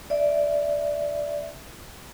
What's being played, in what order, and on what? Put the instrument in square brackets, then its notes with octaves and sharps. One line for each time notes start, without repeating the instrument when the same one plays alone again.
[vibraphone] D5 E5